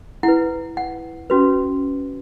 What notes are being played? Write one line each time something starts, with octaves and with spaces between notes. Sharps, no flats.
E4 F#5
B4
F#5
C#4 F#4 B4